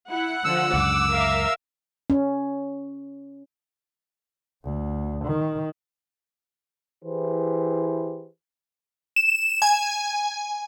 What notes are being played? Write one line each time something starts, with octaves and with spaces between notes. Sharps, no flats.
E4 F#5
D3 F3 E6
C#2 F#2 D6
A#4 E5 F5
C#4
D2
D#3
E3 E4 G4 G#4 B4 C5
E7
G#5